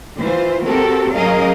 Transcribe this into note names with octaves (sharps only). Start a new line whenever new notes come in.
E3 F4 C5
C4 F#4 G4 A4 A#4
F#3 C#4 G#4 A#4 D#5 F5